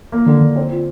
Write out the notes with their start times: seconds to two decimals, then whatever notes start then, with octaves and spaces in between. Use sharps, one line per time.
0.12 A#3
0.26 D3
0.41 D3
0.56 C4
0.71 A#2